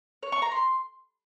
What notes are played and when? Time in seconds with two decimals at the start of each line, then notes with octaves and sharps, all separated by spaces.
0.23 C#5
0.32 C#6
0.42 A#5
0.52 C6